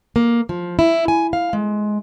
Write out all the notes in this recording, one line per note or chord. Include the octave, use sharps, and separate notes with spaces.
A#3
F3
E4
G#5
F5
G#3